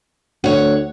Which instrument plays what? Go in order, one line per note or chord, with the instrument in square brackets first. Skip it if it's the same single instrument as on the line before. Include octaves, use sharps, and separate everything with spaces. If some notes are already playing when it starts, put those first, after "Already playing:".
[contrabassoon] D2 [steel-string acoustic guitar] C#5 F#5